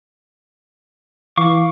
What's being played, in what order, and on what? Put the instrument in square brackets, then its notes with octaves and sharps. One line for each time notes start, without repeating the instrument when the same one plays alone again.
[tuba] E3 [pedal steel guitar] F5 C#6 D6